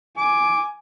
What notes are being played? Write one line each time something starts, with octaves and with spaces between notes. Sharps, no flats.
G#5 D6